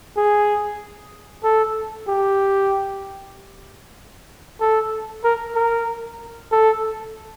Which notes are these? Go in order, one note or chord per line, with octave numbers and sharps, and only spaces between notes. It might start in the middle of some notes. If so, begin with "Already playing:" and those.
G#4
A4
G4
A4
A#4
A#4
A4